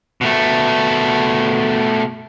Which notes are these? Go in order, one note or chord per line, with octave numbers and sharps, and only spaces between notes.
B2 A3